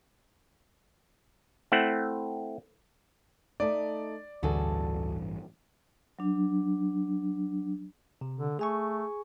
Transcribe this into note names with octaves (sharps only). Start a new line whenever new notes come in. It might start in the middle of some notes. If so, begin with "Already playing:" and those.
A3 C4 E4 F#5
A3 D#4 D5
A1 D2 G2 E3 F#4 G#4 A4
F#3 D4
C3
D3
A3 G#4 G#5 C#6